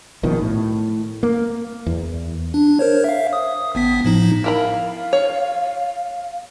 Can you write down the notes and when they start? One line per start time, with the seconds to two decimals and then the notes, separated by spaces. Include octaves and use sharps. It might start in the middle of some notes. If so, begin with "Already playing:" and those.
0.23 A#1 B2 D#3 F3
0.41 A2
1.23 A#3
1.86 E2
2.54 D4
2.79 A#4 C5 C#5
3.04 E5 F5
3.33 D#6
3.75 G#1 B3 B6
4.04 A2 F3 D#4
4.44 E4 A#4 F5 B5
5.13 C#5